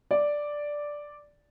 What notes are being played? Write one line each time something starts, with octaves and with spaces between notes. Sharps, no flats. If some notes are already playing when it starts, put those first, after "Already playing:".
D5